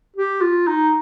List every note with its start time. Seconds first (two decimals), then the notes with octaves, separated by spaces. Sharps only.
0.16 G4
0.41 F4
0.67 D#4